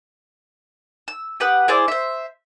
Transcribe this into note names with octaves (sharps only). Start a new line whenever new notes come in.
E6
G4 B4 F#5 D#6
E4 G#4 C5 D5
C5 E5